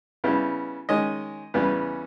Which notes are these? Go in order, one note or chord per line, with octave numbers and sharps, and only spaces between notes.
C#3 G3 B3 E4
D#3 G#3 C#4 D#5
E2 C#3 G3 B3